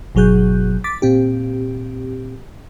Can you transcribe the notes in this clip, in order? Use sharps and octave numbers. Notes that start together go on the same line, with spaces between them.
G1 B2 F#3 G#4 F#6 G6
D6 A6 B6
A#2 C4 G4